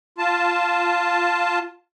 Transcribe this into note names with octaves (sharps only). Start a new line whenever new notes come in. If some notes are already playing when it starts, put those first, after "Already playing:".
F4 A5